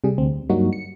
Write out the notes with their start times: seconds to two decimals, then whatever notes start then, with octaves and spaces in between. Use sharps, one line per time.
0.04 C3 G3 G#4
0.18 D2 C4
0.50 G2 F#3 G3 A#3 D#4 F#4
0.73 C#7